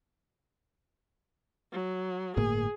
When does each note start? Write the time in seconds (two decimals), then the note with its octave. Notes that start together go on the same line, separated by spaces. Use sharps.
1.72 F#3
2.37 G1 A2 A#3 G#4